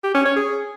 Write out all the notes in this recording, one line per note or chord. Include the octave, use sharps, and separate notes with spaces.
G4
C#4
C#5
G#4